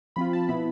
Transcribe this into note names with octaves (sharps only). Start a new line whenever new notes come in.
F3 C4 F4 B5
A5
B2 B3 E4 B5